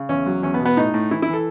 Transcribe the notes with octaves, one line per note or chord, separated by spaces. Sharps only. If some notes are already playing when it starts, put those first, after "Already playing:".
Already playing: C#3
E2 C#4
F#3
E2 C#4
B3
B2
B3
A2 D#4
A2
E3 E4
E4
E3
A4